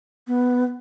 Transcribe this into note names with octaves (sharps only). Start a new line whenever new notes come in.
B3